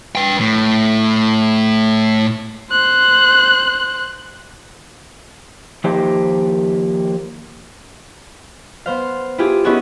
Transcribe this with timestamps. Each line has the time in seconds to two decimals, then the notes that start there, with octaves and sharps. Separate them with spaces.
0.15 B4 G5
0.40 A2
2.72 C5 F#6
5.84 D#3 F3 A#3 D#4 G4 C5
8.86 B3 C5 F5
9.38 E4 F4 G4 G#4
9.64 B3 C#4 D#4 E4 F#4 G#4